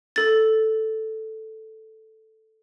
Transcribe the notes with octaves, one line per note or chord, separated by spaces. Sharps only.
A4 A6